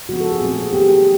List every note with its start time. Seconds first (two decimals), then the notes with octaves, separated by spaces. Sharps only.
0.09 C#3 F3 G#3 B3 F#4
0.20 A4
0.31 G#4
0.41 A#2 F#3 A3 C4
0.72 D#3 G#3 B3 G4
0.89 G4